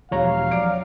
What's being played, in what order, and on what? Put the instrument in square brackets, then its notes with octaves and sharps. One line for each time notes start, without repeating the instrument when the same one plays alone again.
[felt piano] E1 F#4 G4 [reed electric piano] F3 C#5 A#5 [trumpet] F5
[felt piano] F#3 D5 D7